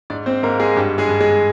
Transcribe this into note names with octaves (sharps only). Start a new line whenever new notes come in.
G#2 D4 D5
C4 C5
G#2 A#3 A#4
G#3 G#4
G2 G4
G#3 G#4
G2
G#3 G#4